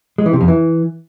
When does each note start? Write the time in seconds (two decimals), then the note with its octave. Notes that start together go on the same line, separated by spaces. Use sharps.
0.18 G#3
0.26 E3
0.33 C3
0.41 F2
0.48 E3